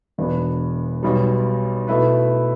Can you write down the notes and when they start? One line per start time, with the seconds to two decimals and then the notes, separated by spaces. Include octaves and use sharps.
0.18 E1 E2 B2 B3 D4
1.03 B1 B2 G3
1.88 B2 A3 E4 B4